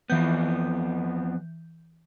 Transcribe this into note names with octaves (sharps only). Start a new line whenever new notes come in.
F2 E3 B3 G6